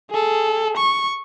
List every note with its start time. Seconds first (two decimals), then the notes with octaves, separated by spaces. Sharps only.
0.11 G#4 A4
0.77 C#6